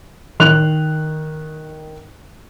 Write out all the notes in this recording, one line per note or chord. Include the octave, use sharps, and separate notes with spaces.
D#3 F#6 F7